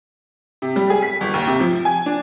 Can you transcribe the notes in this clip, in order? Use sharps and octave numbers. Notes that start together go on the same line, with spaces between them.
C3
G3
G#4
B6
G1
D#2
C3
F3
G#5
D4